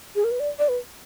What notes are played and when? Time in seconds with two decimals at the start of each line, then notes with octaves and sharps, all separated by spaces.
0.16 G#4
0.24 A#4
0.31 B4
0.40 D5
0.59 D5
0.69 B4